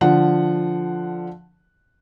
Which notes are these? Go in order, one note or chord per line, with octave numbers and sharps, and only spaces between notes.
D3 F3 F#5